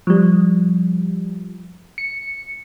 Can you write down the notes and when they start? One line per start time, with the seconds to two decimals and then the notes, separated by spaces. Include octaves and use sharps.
0.07 F3 G3
1.98 C#7